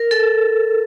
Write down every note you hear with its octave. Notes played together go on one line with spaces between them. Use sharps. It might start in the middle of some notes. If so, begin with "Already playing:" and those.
Already playing: A#4
A4